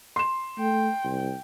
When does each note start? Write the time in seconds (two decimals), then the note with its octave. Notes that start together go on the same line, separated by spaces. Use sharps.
0.16 C6 E7
0.58 A3 G5
1.04 C2